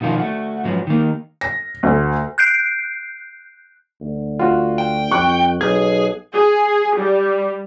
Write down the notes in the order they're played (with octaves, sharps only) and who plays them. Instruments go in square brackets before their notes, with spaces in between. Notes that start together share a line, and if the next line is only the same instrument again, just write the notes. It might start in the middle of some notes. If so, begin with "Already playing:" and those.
[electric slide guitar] B2 D#3 F3 F4
A3 F#4
G#2 F3 F#3 B3
D#3 A#3
[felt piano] A#6
D2
[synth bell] F#6 G6 C7 D7
[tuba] D2
[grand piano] F4 F#4
[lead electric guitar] G5
[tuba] F2 [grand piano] C#6 F#6
[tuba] B1 [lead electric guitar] G#4 [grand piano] G#6
[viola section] G#4
G3